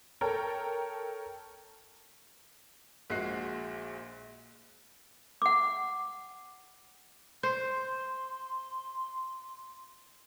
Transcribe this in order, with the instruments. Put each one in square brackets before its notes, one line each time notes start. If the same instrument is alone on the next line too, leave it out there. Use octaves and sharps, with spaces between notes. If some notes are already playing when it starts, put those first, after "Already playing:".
[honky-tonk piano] A4 A#4 C#5 G5 A5 A#5
[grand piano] A#1 A#2 G#3 F#4 F#6 C7
[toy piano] F#5 D6
[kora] C5 [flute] C6